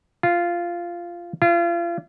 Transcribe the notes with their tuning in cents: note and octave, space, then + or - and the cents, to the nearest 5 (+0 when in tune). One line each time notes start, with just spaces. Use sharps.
F4 -10
F4 -35